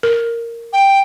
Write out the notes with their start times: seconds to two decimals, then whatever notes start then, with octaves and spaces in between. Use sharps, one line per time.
0.03 A#4
0.73 G5